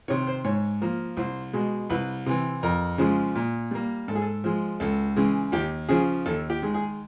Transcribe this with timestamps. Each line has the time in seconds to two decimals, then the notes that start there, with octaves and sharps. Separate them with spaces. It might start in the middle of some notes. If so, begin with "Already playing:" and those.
0.08 C3 D#3 C#5
0.27 C5
0.44 G#2 C#5
0.82 F3 A#3
1.17 C2 C5
1.53 B2 G#3
1.90 C2 B4
2.26 C3 E3
2.63 F2 A#4
2.98 C#3 F3 G#3
3.35 A#2
3.71 G3 A#3
4.08 G#2 A4
4.15 G#4
4.22 A4
4.44 F3 G#3
4.80 C#2 A4
5.16 C#3 E3 G#3
5.52 D#2 G4
5.89 C#3 F3 G#4
6.26 D#2 A4
6.50 G4
6.62 D#3 G#3
6.74 G#4